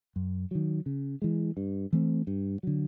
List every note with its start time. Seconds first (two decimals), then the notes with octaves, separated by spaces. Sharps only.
0.16 F#2
0.51 D#3 F#3
0.86 C#3
1.22 E3 G#3
1.57 G2
1.93 E3 A3 C4
2.27 G2
2.63 D3 F#3